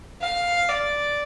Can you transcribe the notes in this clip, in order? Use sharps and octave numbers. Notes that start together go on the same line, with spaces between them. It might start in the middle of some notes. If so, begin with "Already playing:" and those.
F5
D5